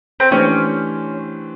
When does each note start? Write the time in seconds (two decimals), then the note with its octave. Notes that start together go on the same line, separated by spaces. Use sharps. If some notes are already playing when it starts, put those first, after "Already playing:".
0.20 C4
0.31 E3 A3 C#4 D4 G4 C5